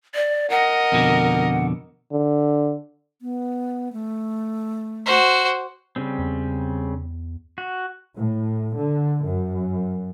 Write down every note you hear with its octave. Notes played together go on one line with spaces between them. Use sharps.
D5
A#4 D#5 F#5
F2 B2 D3
D3
B3
A3
F#4 C5
C#3 G3 C4
E2
F#4
A2
D3
F#2